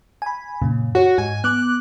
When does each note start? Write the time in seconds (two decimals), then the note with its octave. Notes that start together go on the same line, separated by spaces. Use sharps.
0.22 G#5 B5
0.62 F#2 A#2 C#3
0.95 F#4 C#5 F#5
1.18 G#2 G#5
1.44 B3 D6 F#6